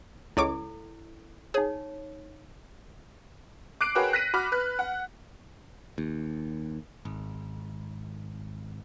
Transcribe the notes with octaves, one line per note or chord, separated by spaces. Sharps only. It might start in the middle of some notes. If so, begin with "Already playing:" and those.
C#2 E4 A4 C#5 D6
D#4 G#4 C#5
D6 F#6 C7 D7
F#4 G#4 A#4 B4 C#5 G5
F#6 A#6 B6 D#7
F#4 B5 D6 F6
B4 F#6
F#5
D#2
G#1